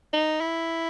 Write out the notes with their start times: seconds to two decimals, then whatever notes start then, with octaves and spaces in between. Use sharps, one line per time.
0.13 D#4
0.41 E4